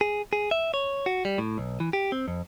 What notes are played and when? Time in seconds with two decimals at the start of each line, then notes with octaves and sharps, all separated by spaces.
0.01 G#4
0.33 G#4
0.51 E5
0.74 C#5
1.06 F#4
1.25 G3
1.38 A2
1.58 B1
1.80 E3
1.93 G4
2.12 C4
2.28 F2